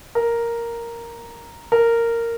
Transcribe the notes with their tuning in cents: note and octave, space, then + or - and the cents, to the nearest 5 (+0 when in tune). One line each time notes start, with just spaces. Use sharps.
A#4 +0
A#4 -10